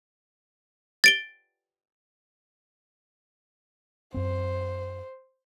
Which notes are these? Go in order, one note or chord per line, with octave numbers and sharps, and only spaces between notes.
A6 D7 G7
F#2 C4 C5